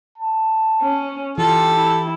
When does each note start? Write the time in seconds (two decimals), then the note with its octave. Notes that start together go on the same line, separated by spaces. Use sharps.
0.18 A5
0.82 C#4
1.38 E3 F4 G4 A4
1.75 E4